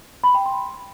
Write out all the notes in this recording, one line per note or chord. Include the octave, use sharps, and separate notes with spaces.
B5
G5
C6